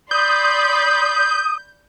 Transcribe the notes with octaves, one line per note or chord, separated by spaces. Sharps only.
D5 B5 C6 D#6 G6